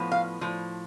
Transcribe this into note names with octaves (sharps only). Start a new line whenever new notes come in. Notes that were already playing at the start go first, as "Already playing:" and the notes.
Already playing: A2 F3 B3
F5
A2 F3